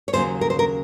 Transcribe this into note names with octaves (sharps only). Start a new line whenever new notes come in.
C#5
D#2 C#3 F#3 A#3 C#4 C5
A#4
C5
A#4